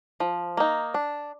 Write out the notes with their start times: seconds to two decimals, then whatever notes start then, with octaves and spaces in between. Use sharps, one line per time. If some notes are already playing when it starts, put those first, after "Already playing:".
0.20 F3
0.57 A#3 D#4
0.94 D4